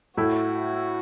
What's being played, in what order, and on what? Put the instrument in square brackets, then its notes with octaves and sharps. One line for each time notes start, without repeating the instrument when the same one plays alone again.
[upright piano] A2 A3 E4 [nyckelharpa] F#4